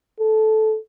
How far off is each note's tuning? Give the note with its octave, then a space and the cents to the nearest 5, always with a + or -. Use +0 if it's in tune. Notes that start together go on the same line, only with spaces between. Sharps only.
A4 -15